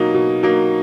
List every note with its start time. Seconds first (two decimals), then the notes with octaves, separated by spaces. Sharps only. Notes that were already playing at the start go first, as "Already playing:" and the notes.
Already playing: B2 F#3 A#3 D#4
0.14 B2
0.43 F#3 A#3 D#4